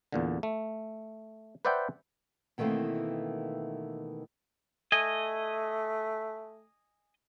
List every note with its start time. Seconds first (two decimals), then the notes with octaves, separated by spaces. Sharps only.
0.12 E2 A#2 D3
0.43 A3
1.65 B4 C5 D5 E5 F#5 G5
2.58 B2 D#3 E3 A3 A#3 C4
4.92 A3 D#5 G#5